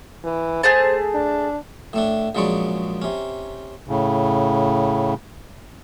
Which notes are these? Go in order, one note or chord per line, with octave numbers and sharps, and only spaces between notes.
E3
A3 G#4 C5 A5
D4
A2 A3 D4
A#1 C#3 F#3 G#3 D5 C#6
C3 C#4
A2 C#3